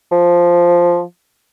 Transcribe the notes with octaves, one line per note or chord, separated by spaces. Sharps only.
F3